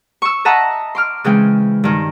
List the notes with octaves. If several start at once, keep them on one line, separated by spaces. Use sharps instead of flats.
C#6 E6
D#5 E5 F#5 A5 A#5
C6 D6 F6
C#3 E3 G#3 C4 F5 G5
G2 D#3